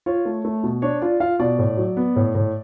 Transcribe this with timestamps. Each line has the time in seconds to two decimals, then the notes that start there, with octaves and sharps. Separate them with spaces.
0.06 F4 C#5
0.25 A3
0.45 A3
0.63 B2
0.82 D4 C#5
1.02 F4 D5
1.20 F4 F5
1.40 B2 D5
1.59 A2
1.77 F#3
1.97 B3
2.16 A2
2.35 A2